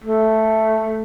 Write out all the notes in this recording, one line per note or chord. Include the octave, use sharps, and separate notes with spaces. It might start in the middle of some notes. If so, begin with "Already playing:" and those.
A3